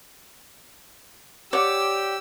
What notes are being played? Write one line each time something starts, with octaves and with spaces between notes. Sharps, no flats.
G4 C#5 D5 F#5 E6